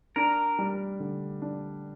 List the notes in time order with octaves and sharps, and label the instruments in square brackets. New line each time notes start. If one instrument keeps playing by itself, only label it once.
[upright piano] D4 [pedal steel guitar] A#4
[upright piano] G3
D3
D4